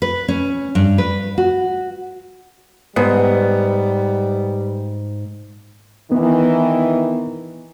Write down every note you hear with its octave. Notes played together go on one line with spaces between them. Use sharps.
B4
C#4
G2
B4
F#4
G#2 G3 B3
D#3 E3 B3